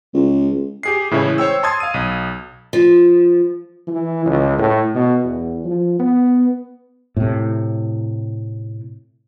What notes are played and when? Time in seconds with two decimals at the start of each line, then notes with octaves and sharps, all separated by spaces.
0.14 C#2
0.83 G4 G#4 C7
1.11 A2 C#3 E3 G#3 E4 C#5
1.38 C5 C#5 G5 E6
1.63 A5 C6 D#6 G#6 A6
1.80 F5 D#7
1.94 B1
2.73 F3
3.88 E3
4.26 C#2
4.58 A2
4.95 B2
5.25 E2
5.65 F3
5.99 B3
7.17 A2 C3